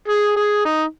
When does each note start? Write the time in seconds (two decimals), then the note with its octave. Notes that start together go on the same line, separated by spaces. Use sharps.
0.08 G#4
0.36 G#4
0.65 D#4